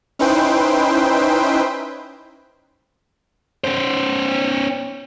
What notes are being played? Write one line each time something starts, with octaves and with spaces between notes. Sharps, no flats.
C#4 D#4 E4 B4 C5 G5
C#4 C5